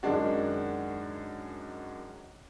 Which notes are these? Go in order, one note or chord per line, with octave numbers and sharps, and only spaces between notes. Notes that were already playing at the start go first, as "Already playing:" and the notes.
F#2 D#3 G#3 D4 F#4